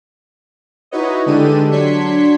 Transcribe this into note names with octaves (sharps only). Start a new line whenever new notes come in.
D#4 E4 F#4 B4 C#5 D#5
D3 G#3 D4 G4 A4 D#7
F#3 D4 C6 G#6 B6 C#7